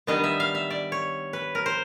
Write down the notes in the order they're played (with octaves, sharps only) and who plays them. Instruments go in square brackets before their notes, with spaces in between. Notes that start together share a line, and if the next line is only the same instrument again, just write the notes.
[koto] D#3 G3 B3 D4 D#5
E5
F5
E5
D5
C#5
B4
A#4
C5